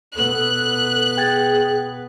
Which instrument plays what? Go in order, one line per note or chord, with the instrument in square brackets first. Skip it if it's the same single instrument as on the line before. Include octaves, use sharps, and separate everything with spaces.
[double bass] B2 B3 [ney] A4 [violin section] F#6
[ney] G#4 [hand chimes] G5 G#6 A6